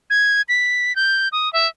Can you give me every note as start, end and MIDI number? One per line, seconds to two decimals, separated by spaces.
0.10 0.42 92
0.49 0.95 95
0.96 1.28 91
1.32 1.51 87
1.53 1.67 76